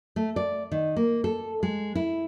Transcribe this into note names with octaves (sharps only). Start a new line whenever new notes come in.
A3
D5
D#3
A#3
A4
G#3
E4